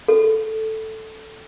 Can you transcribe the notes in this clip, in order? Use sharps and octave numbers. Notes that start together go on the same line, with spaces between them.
A4